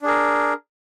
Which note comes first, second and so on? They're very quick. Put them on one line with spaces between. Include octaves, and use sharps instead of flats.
D4 G#4 A#4